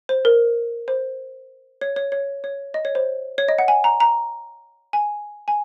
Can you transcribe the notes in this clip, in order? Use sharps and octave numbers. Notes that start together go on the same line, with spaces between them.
C5
A#4
C5
C#5
C#5
C#5
C#5
D#5
C#5
C5
C#5
D#5
F#5
G#5
A#5
A#5
G#5
G#5